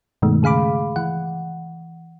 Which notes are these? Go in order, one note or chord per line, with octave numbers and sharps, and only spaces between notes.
G2 B2 D#3 G#3 A3
C#3 G#4 F5 B5 D6
E3 F#5